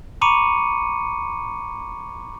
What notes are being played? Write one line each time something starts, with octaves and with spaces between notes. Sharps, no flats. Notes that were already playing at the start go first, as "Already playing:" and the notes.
A#5 B5 C#6 D6 C#7 D#7